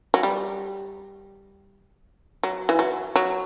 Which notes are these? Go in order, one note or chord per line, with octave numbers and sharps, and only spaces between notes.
F#3
G3
F#3
E3
F#3
F#3